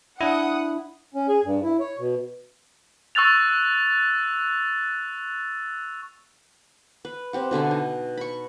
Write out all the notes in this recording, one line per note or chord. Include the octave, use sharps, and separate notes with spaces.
D4 E4 F#5 D#6
C#4
G#4
G2
E4
C#5
B2
C#6 E6 F#6 A6 F7
B4
C4 G4 F#5
B2 D3 E5 G#5
D#4
B5 C#6